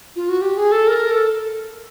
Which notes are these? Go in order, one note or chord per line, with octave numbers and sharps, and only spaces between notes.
F4
F#4
G4
G#4
A4
A#4
A4